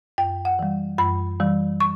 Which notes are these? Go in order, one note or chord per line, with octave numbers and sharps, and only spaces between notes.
F#2 G5
F#5
E3 G3
F#2 B5
E3 G3
C#6